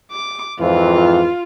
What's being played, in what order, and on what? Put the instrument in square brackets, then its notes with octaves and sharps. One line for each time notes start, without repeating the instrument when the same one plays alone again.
[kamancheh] D6
[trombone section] F2 G#2 E3 [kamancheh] F4